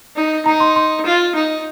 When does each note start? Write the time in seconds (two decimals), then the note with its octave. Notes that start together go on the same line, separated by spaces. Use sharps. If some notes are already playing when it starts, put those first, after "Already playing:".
0.16 D#4
0.46 D#4 A#5
0.60 C6
0.76 C6
1.06 F4
1.35 D#4